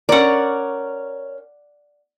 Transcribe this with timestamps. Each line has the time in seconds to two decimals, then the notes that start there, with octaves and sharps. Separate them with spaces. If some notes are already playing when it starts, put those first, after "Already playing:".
0.09 C#4 A#4 D5 F#5